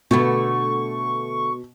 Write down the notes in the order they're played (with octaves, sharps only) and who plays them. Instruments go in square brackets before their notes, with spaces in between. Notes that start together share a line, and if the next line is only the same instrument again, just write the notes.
[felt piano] B2 [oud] D3 A3 B3 [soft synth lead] C#6